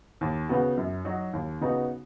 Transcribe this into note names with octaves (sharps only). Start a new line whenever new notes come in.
D#2
C#3 B3 F#4
F#2
F#3 D#4 F#4
D#2
C#3 B3 D#4 F#4